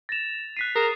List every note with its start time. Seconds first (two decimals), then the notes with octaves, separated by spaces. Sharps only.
0.09 A6 A#6 E7 F7
0.57 F#6 B6 C7 D#7
0.76 G#4 A#4 D#6 C7 E7